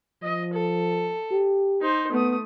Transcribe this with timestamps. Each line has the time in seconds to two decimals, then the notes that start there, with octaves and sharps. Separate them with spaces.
0.22 F3 D#5
0.53 A4
1.31 G4
1.81 D#4 C5
2.12 A3 B3 D#6